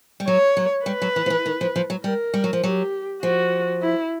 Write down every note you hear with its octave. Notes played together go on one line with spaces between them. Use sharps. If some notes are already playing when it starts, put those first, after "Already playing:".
G3
F#3 C#5
F#3
G3 B4
F#3
E3
F3
E3
D#3
F3
F3
F#3
G3 A#4
G3
F#3
F3
F#3 G4
F3 F#4
E4